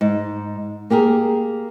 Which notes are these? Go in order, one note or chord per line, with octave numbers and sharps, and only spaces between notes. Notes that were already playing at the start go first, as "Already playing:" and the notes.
G#2
A#3 G4 G#4 A#4